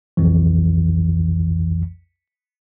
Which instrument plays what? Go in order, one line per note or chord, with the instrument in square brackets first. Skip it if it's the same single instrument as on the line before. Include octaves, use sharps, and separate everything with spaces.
[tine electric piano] B1 F2 E3